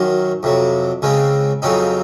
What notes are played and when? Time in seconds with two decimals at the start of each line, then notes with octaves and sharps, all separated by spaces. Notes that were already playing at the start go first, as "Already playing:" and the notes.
Already playing: F#2 D#3 F#3
0.43 F2 C3 F#3
1.02 C#2 C#3 G#3 C4
1.62 F2 C#3 F#3 C4 D#4